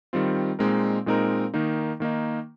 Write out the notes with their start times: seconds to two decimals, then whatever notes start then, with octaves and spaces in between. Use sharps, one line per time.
0.13 D#3 G3 C4 F4
0.59 A#2 G#3 C4 D#4 A#4
1.06 A#2 G#3 C4 D#4 A#4
1.54 D#3 A#3 D#4
2.00 D#3 A#3 D#4